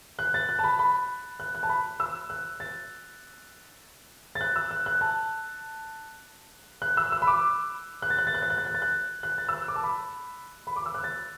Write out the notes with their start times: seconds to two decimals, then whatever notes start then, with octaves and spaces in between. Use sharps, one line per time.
0.19 F#6
0.34 A6
0.49 F#6
0.59 A5
0.64 B5
0.79 B5
1.40 F#6
1.55 F#6
1.63 A5
1.69 B5
2.00 E6
2.30 F#6
2.60 A6
4.35 A6
4.41 F#6
4.56 E6
4.71 F#6
4.86 F#6
5.01 A5
6.82 F#6
6.97 E6
7.12 E6
7.22 B5
7.27 D6
8.02 F#6
8.10 A6
8.18 F#6
8.27 A6
8.34 F#6
8.42 A6
8.50 F#6
8.58 A6
8.66 F#6
8.74 A6
8.82 F#6
9.23 F#6
9.38 A6
9.49 E6
9.53 F#6
9.68 D6
9.76 A5
9.83 B5
10.67 B5
10.76 D6
10.86 E6
10.94 F#6
11.04 A6